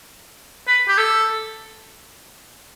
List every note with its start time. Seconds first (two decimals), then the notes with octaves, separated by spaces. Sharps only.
0.67 B4
0.88 G4
0.98 A4